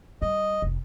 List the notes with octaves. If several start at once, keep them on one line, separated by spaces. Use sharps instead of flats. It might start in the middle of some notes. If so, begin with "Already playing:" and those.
G3 D#5
F1 F2